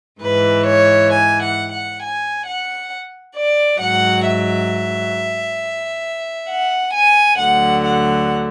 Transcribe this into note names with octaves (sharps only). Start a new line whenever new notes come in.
G#2 E3 B4
C#5
G#5
F#5
F#5
G#5
F#5
D5
G#2 F#3 F#5
E5
F#5
G#5
D2 D3 F#3 F#5
F#5